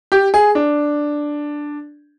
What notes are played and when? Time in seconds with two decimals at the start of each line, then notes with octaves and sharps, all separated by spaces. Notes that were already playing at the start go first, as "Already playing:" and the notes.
0.12 G4
0.34 G#4
0.55 D4